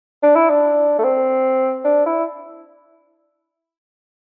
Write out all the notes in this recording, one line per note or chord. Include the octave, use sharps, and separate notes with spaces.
D4
E4
D4
A3
C4
D4
E4